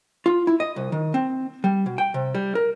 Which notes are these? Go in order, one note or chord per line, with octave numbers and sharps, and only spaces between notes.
F4
E4
D#5
C2
D#3
C4
G3
B2
G5
C3
G3
A#4